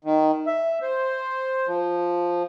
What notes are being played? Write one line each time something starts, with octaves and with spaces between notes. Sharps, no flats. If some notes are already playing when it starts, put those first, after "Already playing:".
D#3
E5
C5
F3